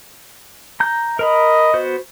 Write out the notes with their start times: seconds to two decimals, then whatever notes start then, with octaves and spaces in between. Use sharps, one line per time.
0.80 A#5 G6
1.19 A#4 D#5 A#5 B5
1.74 B3 F#4 C5